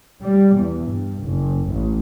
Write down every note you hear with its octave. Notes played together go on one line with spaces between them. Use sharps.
G3
E2
G2
F#1
A1